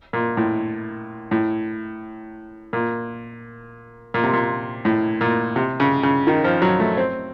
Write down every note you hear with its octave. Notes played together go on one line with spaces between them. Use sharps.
A#2
A2
A2
A#2
A#2
C3
A#2
A2
A#2
C3
C#3
C#3
D#3
F3
F#3
A3
C4